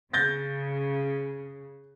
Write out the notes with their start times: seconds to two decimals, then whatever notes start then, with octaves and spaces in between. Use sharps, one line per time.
0.13 C#3 G6 A6 A#6